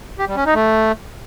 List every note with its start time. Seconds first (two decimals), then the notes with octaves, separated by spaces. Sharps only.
0.19 G4
0.28 G3
0.37 C#4
0.46 D#4
0.55 A3